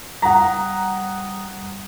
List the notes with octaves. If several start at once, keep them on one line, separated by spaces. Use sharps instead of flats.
G3 F#5 A#5 D#6